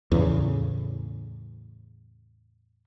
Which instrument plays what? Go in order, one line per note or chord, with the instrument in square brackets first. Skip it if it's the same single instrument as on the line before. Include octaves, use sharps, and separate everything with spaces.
[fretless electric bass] E2 A2 C#3